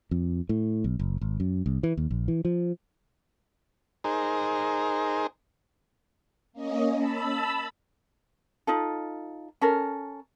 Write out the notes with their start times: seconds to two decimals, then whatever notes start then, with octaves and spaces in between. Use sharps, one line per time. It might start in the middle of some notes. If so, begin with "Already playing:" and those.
0.11 F2
0.49 A2
0.84 B1
0.99 F#1
1.21 G#1
1.40 F#2
1.66 C2
1.83 E3
1.97 D#2
2.11 A#1
2.28 E3
2.45 F3
4.04 D#4 G#4 A#4 C5
6.53 A#3 C#4 D#5
6.97 A5 B5 E6
8.67 D#4 F4 A4
9.61 C#4 A4 A#4